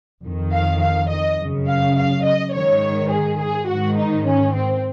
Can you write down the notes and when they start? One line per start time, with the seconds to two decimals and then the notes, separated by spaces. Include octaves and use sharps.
0.22 F2 D#3
0.51 F5
0.80 F5
1.09 D#5
1.38 F#2 C#3
1.66 F5
1.95 F5
2.23 D#5
2.52 G#2 D#3 C#5
3.09 G#4
3.38 G#4
3.67 G#2 D#3 F#4
3.96 D#4
4.25 C#4
4.53 C4